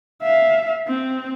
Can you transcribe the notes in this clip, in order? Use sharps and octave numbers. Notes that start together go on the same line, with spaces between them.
E5 F5
C4